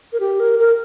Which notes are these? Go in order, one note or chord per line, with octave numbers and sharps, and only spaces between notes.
A#4
G4
A#4
A#4